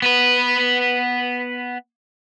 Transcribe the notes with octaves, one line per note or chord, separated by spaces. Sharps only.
B3 B4